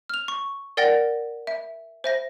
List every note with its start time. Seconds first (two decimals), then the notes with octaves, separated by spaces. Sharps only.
0.09 F6 F7
0.28 C#6
0.77 A#4 D5 F#5 G5 A6 A#6
1.47 E5
2.04 C5 E5 A#6